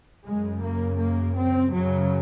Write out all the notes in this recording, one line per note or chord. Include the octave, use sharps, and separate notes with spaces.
F#2 C#3 G#3
A#3
A#3
C4
F#2 C#3 F#3